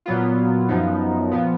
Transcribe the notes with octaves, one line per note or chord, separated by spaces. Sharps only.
A#2 F#3 B3 F4
F#2 F3 B3 D#4
A#2 F3 B3